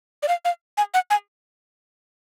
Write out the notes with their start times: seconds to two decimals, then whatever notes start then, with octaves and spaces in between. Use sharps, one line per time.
0.23 D5
0.28 F5
0.45 F5
0.77 G#5
0.94 F#5
1.10 G#5